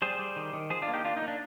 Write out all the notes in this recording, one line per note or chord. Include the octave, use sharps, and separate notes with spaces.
G3 G#4 C5
G3
D#3
D#3
F3 G#4 C5
D4 F4
A#3
D#4 G4
A#3 D4 F4
D#4
A#3
D4